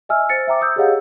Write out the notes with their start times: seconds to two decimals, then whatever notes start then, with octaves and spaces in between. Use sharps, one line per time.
0.09 D#5 E5 G#5 E6 F6
0.29 C5 A6 C#7
0.47 E5 G5 A#5 D6
0.61 D#6 E6 G6
0.76 G4 G#4 C#5 D#5 F5 F#5